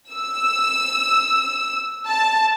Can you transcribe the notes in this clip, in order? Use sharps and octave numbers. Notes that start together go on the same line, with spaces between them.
E6
A5